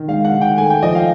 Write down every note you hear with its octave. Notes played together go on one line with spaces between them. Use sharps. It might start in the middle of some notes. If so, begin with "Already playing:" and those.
Already playing: D#3
G#3 F5
F#5
D#3
G5
A3 G#5
G5
F3 D#5
F5